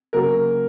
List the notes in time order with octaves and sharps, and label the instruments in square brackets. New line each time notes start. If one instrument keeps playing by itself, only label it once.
[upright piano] C#3 F#3 A#3 A#4